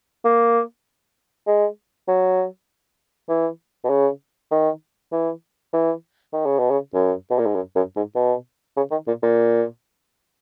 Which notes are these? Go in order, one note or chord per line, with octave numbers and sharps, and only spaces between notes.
A#3
G#3
F#3
E3
B2
C#3
D#3
E3
E3
D#3
C#3
B2
C#3
F#2
B2
A#2
G#2
F#2
F#2
G#2
B2
C#3
D#3
A#2
A#2